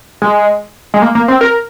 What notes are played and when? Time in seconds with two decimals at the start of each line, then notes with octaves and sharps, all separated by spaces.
0.22 G#3
0.94 G#3
1.02 A#3
1.15 A#3
1.28 C4
1.41 A#4